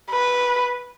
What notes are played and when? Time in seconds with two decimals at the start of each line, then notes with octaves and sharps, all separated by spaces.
0.11 B4